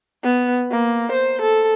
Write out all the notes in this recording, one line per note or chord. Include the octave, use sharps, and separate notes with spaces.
B3
A#3
C5
A4